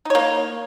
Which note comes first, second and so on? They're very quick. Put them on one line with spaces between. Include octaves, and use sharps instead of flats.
D#4 C#5 A#3